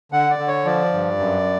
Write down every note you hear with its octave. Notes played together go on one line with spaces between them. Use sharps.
D3 F#5
D5
D3
C#5
F3 D5
G2
F#2